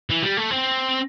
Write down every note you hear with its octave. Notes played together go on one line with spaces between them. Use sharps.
E3
G3
A3
C4